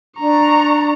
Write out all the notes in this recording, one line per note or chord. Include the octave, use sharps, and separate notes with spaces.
D4 A#5 C#6